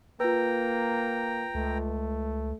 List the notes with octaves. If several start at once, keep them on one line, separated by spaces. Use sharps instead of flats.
A#3 F4 B4 G5 A#5
C#2 A3